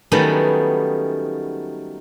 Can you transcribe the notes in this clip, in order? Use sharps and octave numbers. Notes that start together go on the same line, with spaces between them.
D#3 F#3 G3 A3 B3 C#4